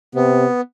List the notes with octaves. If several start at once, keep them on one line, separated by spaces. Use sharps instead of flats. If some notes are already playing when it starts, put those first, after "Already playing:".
C3 B3